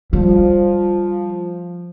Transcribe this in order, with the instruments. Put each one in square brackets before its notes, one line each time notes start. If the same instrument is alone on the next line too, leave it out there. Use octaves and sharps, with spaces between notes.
[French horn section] F3 [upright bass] G3